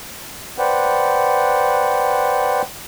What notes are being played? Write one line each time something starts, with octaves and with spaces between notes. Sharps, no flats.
B4 C5 D5 F#5 G5